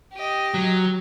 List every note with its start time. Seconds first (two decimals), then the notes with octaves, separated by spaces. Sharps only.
0.13 G4 D#5
0.54 F#3